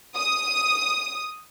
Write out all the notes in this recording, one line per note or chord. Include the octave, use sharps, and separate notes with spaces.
D#6